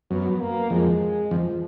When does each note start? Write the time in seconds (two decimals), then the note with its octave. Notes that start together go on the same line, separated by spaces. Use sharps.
0.11 F#2 B3
0.40 A#3
0.70 F2 G#3
1.31 F2 F3